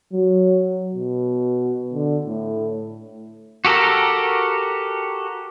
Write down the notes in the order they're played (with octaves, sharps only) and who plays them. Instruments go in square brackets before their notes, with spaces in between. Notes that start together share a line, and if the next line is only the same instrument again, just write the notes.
[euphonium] F#3
B2
D3
A2
[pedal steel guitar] F#4 G4 A4 A#4 A#5